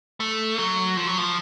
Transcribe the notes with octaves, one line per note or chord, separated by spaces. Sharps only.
A3
F#3
F3
F#3
F3